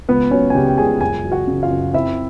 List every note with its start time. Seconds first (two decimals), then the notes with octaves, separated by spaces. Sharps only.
0.09 C#2 B3 B4
0.31 F#3 C#4 C#5
0.50 G#5
0.55 C#3 G4 G5
0.68 G5
0.78 C#2 G#4 G#5
1.01 F#2 G#4 G#5
1.25 F#3
1.32 F#4 F#5
1.47 C#3
1.63 F4 F5
1.70 F#2
1.93 C4 E4 E5